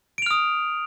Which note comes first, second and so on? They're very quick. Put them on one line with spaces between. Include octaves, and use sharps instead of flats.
D7 F7 F6 D#6